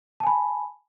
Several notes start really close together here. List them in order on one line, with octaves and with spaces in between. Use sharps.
A5 G#5 B5